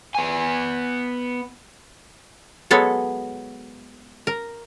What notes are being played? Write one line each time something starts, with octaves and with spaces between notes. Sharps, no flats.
B3 G#5
F#3 G#3 B3 A4 C#5
A#4